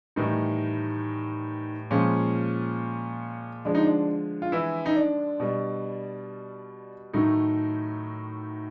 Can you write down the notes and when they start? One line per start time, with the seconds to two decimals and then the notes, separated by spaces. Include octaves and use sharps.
0.16 A2 D#3 E3 G3 D#4
1.91 A#2 F3 G#3 C#4
3.65 D3 F3 G#3 D4
3.75 D#4
3.83 D4
4.42 F4
4.52 E3 E4
4.86 D#4
4.96 D4
5.40 B2 G3
7.13 A2 D#3 F#3 A3 D#4